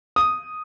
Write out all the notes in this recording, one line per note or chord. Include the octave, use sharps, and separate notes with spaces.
D#6